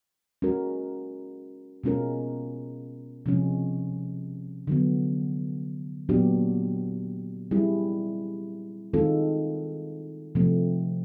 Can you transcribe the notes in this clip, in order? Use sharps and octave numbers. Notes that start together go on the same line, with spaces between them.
G#3 C#4 F#4 A#4
B2 G#3 C#4 F4 A#4
C3 F3 G#3 C#4
D3 F#3 B3
A#2 F#3 B3 D4 G4
G3 C4 E4 G#4
D#3 G#3 C4 F4 A4
C3 F3 A3 C4